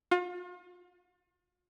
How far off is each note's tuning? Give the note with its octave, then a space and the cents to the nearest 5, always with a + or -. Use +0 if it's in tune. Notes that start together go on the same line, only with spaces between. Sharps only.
F4 +40